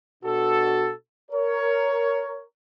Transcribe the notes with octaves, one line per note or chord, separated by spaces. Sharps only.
B2 D4 F#4 A4
A#4 C#5